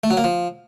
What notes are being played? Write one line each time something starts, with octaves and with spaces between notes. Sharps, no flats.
A3
F#3
A#3
F3